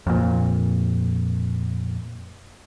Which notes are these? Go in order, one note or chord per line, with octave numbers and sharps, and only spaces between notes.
F2 A#2